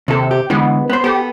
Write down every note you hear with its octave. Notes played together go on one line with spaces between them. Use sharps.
D#2 C3 A4
G4
D3 E3 G#3 B3
B3 C5
B3 G4 A4